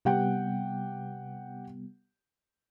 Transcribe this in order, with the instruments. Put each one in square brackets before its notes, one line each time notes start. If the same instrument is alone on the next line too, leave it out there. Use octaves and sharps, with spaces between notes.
[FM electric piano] C3 G3 B3 [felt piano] G4 F#5 G5